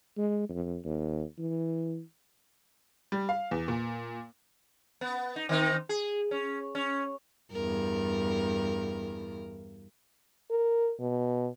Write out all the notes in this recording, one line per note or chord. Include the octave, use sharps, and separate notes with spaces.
G#3
F2
D#2
E3
G3
F5
E2
A#2
B3
D#4
D#3 C4 D#4
G#4
C#4
C#4
E2 G2 A#4
A#4
B2